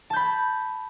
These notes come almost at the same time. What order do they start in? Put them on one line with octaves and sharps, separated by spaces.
A5 G6 B5